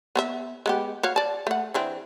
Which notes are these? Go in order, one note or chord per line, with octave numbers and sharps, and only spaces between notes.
B3 C#5 E5
G#3 B3 G4
F#4 C#5 F5
D5 A5
A3 F#5
E3 C4 D4